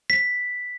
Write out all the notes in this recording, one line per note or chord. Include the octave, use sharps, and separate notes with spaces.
B6